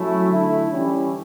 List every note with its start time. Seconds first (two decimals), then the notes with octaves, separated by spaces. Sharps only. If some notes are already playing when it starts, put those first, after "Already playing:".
Already playing: F#3 A3 C#4 E4
0.29 D3 A3 E4
0.70 E3 G3 C#4